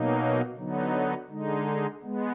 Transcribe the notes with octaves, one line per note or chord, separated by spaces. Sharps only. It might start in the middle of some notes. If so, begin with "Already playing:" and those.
Already playing: B2 F#3 A#3 D#4
D3 F#3 B3 D#4
D3 G#3 D#4
G#3 B3